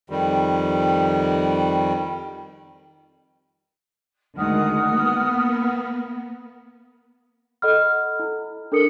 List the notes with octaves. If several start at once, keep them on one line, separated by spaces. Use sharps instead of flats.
F2 D#3 G3
D2 D#3 G#3 F#5 D#6 F6
A#3 B3
A4 D#5 F#5 B5 F6
E4
D4 A4 A#4 D#6 C#7